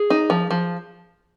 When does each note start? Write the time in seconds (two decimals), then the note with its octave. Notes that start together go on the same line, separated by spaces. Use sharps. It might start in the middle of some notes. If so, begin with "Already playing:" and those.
Already playing: G#4
0.10 D#4
0.30 F3
0.51 F3